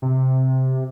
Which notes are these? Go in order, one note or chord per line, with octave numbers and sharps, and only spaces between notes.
C3